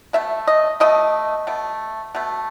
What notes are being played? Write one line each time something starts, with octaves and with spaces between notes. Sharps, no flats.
B2 A3 E5
D#5
B2 A3 D#5
B2 A3
B2 A3